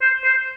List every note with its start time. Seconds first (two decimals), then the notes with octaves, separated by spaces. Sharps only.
0.02 C5
0.24 C5